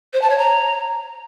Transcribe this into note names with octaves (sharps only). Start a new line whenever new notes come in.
C5
A5
C#5
A#5